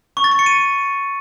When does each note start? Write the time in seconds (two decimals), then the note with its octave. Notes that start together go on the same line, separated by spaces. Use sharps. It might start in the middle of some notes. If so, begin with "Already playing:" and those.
0.17 C#6
0.24 A6
0.32 C#6
0.39 C#7
0.46 D#7